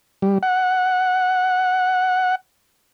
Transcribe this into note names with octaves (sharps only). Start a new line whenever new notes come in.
G3
F#5